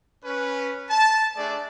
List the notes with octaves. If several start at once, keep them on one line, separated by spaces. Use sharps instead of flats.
C#4 B4
A5
A3 D4 G#4 D5